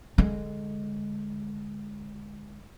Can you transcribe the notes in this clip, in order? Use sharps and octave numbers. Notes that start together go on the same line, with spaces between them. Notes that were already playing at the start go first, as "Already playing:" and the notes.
D3 G#3